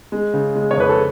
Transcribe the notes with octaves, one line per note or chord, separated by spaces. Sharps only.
G#3
C#3
G#3
C#5
F2 B4
A4